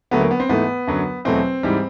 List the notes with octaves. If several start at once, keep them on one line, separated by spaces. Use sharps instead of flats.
D2 D3 F#3 A3 B3
A#3
B3
C4
G#2 E3 A3 B3
F#2 D3 F#3
E2 B2 F#3 A3 C4
G#2 E3 G3